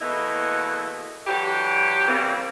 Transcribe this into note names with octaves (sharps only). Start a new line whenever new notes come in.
E2 B2 A3 A#3 E4 D#5
D3 E3 F#3 G4
C#3 E3 G3 A#3 C4